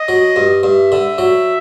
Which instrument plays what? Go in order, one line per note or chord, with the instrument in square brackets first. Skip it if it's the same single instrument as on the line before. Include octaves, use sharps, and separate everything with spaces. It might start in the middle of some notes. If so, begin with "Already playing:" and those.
Already playing: [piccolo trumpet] D#5
[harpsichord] F#3
G2
[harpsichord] G2 [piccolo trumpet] E5
[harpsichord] D3
F#3